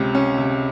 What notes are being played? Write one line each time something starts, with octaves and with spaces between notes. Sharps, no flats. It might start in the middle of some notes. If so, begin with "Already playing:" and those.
Already playing: C#2 C3 C#4
C#4
C3